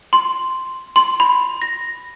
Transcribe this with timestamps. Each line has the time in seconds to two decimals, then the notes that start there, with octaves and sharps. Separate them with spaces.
0.13 C6
0.96 C6
1.20 B5
1.62 A#6